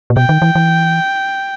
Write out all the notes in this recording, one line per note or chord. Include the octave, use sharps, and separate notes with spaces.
A#2
B2 G5
D#3
E3
E3